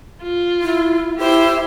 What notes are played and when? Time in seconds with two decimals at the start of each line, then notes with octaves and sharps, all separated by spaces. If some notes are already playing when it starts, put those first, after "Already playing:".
0.22 F4
0.62 E4
1.18 E4 G4 C5